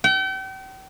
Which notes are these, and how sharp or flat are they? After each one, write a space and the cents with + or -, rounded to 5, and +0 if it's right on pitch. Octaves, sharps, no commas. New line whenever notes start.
G5 -40